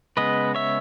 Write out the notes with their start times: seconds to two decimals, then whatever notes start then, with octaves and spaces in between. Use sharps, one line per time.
0.17 C#3 G#3 B3 B4 D#5
0.55 C#5 E5